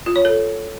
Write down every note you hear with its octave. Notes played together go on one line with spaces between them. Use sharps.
F4
C#5
A4